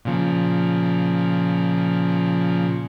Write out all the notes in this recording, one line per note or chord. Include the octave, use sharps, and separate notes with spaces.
A#2 C#3 F3